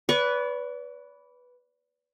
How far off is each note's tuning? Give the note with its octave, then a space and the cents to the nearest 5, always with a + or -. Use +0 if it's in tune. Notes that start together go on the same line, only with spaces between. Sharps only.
B4 +0 D5 -40 C#6 +0